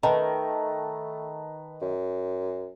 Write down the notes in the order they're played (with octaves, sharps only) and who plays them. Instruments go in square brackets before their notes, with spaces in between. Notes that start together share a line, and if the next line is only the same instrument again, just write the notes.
[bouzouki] D#3 [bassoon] A3 [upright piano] B4 A5 A#5
[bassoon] F#2